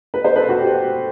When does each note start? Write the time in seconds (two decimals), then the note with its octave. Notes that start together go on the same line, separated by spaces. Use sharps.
0.14 B4
0.24 C5
0.36 A4 B4
0.49 F#4
0.59 G4